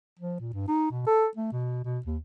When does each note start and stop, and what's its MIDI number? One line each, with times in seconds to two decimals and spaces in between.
0.19 0.39 53
0.40 0.51 46
0.53 0.63 43
0.68 0.90 63
0.91 1.05 47
1.07 1.27 69
1.37 1.49 57
1.52 1.83 47
1.85 1.99 47
2.06 2.17 39